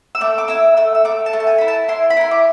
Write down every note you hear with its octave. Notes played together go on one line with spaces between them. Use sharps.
E6
A3 D6
D6
E4 E6
A3 E6
E6
A3 D6
A5
A3
A5
G#5
E4 B5
A5
E4 C6
B5
E4 C6
D6